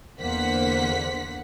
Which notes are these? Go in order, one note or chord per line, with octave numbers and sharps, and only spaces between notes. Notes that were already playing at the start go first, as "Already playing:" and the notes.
E2 D3 A#3 C5 F#5 B6